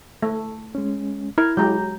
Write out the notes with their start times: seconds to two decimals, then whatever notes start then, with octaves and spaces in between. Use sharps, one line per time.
0.23 A3
0.75 G#3 C#4
1.38 E4 A#4 F6 G#6
1.57 F#3 G#3 G4 A#5 G6